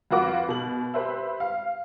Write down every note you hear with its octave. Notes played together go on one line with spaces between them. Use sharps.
F2 F4 F#4 B4 D6
B2 F#7
G4 B4 C5 E5
F5